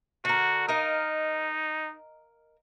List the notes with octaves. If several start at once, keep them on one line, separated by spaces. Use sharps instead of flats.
D3 F#4 A#4
D#4 A#4 D#5 F5